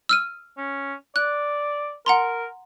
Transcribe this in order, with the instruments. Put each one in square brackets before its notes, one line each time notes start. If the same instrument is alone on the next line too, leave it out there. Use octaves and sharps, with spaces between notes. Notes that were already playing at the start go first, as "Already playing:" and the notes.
[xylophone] E6 F6 D#7
[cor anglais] C#4
[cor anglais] D5 [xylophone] F#6
[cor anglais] A#4 [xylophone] F#5 A#5 C6